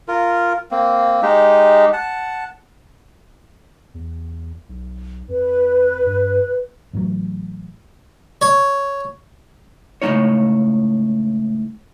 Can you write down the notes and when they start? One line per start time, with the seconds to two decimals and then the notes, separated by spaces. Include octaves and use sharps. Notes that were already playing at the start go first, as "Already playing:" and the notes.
0.08 F4 A#4
0.71 A#3 C4
1.22 G#3 D#4 G4
1.93 F#5 A5
3.94 E2
4.69 B1
5.29 F2 B4
6.06 G2
6.93 A1 A2 C3 F#3
8.42 C#5
10.02 C#2 A2 C#3 F3 D#4 C#5